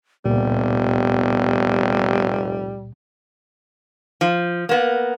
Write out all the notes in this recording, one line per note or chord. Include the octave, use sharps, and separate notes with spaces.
F1 C#2 A#2 G3 B3
F3
A#3 B3